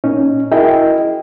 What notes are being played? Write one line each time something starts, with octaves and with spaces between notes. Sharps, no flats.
A#2 C#4 D#4
E4 F#4 G#4 A#4 D#5 G5